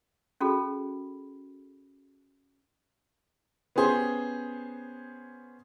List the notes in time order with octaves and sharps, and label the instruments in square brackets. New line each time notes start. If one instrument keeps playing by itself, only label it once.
[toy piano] C#4 F#4 G#4 A4 B5
[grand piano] B3 C#4 G4 G#4 C5